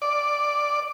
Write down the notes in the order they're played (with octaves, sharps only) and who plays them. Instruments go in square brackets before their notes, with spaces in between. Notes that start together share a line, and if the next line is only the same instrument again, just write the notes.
[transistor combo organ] D5